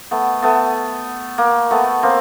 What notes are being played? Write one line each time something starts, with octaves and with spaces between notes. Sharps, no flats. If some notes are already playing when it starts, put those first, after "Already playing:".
A3 B3
A3 B3
A#3
A3 B3
A#3 C4